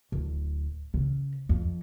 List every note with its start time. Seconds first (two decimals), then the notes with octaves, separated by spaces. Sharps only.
0.12 D1
0.94 C#3
1.49 F2